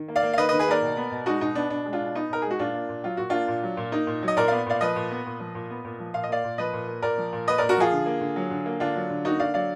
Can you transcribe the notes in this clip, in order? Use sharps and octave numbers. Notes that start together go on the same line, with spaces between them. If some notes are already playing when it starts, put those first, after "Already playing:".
Already playing: D#3
A#3
D5 F5
A#3
F5
D#3 B4 D#5
D#3 B4 D#5
G#4 B4
A#3 A#4 D5
B2
B3
B2
G#3 D#4 F#4
B2 D#4
B3 D4
B2 D4
G#3
D4 F4
B2
B3 D#4
B2 A#4
G#3 G#4
F#4
A#2 D4 F4
A#3
A#2
F#3 F4
A#2 F#4
A#3 D4 F4
A#2
F#3
A#2
A#3 D#4
A#2
F#3
D#5
A#2 A#4 D5
B3 D5 F5
A#2 D5 F5
F3 B4 D#5
A#2
B3
A#2
F3
A#2
B3
A#2
F3
A#2 F5
D#5
A#3 D5 F5
A#2
F3 B4 D#5
A#2
A#3
A#2 A#4 D5
F3
A#2
A#3 B4 D#5
A#2 A#4 D5
F#4 A#4
F3 F4 G#4
D3
A#3
D3
F#3
D3
A#3
D3 D4 F4
F#3
D3
A#3 D#4 F#4
D3 D5 F5
F#3 D5 F5